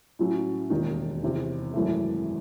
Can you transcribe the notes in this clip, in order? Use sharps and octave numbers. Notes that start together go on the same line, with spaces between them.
A2 F#3 C#4
E1 D#2 D#3
E2 C3 D#3
G#1 F#2 E3 A3